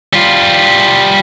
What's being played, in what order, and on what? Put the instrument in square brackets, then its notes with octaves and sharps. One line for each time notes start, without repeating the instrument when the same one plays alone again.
[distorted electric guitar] G3 F4